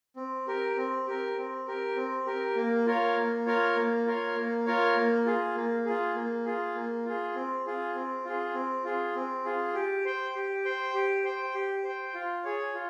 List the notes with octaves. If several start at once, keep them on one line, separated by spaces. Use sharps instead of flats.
C4
G4 A#4
C4
G4 A#4
C4
G4 A#4
C4
G4 A#4
A#3
F4 A#4 C#5 F5
A#3
F4 A#4 C#5 F5
A#3
F4 A#4 C#5 F5
A#3
F4 A#4 C#5 F5
A#3
F4 G#4
A#3
F4 G#4
A#3
F4 G#4
A#3
F4 G#4
C4
F4 G#4
C4
F4 G#4
C4
F4 G#4
C4
F4 G#4
G4
C5 G5
G4
C5 G5
G4
C5 G5
G4
C5
G5
F4
G#4 C#5
F4